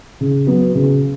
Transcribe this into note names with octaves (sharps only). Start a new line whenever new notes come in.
C#3
F#3 B3
C#3